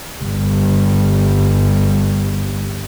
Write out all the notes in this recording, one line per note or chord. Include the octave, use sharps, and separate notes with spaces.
G1 G3